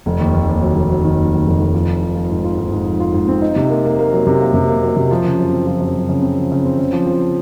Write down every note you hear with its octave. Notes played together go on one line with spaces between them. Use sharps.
F1
D#2
D#2
D#2
F#3
F1
F#3
D#3
D#2
F#3
F1
F1
F3
F4
F4
F3
G#2
F4
G#2
G#2
F3
F4
G#2
C4
D#4
C3
A#3
A#3
A#3
F#3
C3
A#3
C3
A#3
F#3
C3
F3
C#3
F#2
C4
F3
F#2
F#2
C#3
C4
F3
C#3
C4
C#3
F3
F3